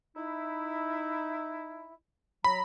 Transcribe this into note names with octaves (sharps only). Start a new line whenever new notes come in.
D#4 E4
F#3 A#5 B5